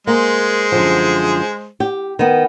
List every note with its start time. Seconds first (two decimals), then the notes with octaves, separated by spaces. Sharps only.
0.07 G#3 A#3 G#4 C5
0.72 F#2 D3 F3
1.80 G4
2.19 D#3 B3